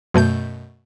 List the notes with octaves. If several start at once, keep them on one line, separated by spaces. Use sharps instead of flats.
F#2 B2 A3 G6